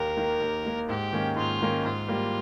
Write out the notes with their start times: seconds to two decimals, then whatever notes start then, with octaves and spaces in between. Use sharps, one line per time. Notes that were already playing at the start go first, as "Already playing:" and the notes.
Already playing: D#2 A#4
0.17 D#3 A#3
0.41 D#2
0.64 D#3 A#3
0.89 G#2 G4
1.13 D#3 A#3 C#4
1.36 G#2 F4
1.61 D#3 A#3 C#4
1.84 G#2 F4
2.08 G3 A#3